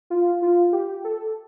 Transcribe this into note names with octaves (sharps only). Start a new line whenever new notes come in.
F4
F4
G4
A4